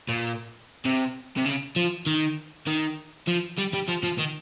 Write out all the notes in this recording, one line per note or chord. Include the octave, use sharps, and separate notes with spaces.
A#2
C3
C3
C#3
F3
D#3
D#3
F3
G3
G3
F3
F3
D#3